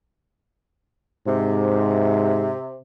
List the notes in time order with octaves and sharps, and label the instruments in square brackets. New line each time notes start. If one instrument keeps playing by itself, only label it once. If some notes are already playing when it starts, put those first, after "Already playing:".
[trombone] G#2 [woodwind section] C3